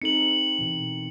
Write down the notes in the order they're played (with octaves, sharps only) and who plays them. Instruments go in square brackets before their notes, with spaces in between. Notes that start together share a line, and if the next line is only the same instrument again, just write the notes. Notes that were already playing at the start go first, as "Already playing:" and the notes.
[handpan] C4 D#4 A4 [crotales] C#7 F#7
[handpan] B2 E3